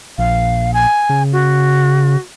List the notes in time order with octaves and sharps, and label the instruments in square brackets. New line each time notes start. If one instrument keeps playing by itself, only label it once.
[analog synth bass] A#1 [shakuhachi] F5
[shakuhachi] G#5
[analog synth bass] C#3
[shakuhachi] F#4